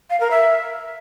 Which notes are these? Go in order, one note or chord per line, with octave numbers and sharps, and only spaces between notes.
F5
A#4
E5